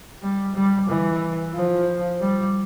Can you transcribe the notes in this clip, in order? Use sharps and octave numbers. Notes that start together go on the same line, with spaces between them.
G3
G3
E3
F3
G3